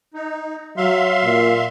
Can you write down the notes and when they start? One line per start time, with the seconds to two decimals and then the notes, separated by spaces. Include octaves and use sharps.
0.14 D#4
0.77 F#3 E5 F5 C6
1.24 A#2